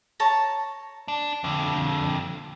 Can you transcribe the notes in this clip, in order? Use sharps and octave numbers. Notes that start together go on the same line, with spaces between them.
C#5 A5 A#5
D4
F2 D3